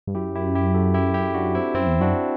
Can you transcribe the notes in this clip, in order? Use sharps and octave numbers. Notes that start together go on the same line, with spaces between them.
G2
F#2 E4 G4
E4 G4
E4 G4
F#4 A4
E4 G4
E4 G4
D4 F#4
C4 E4
F#2 C4 E4
E2
F#2 D4 F#4